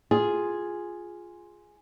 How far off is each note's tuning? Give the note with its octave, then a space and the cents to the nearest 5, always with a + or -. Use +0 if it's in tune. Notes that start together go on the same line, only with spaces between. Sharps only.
F4 +0 G#4 +0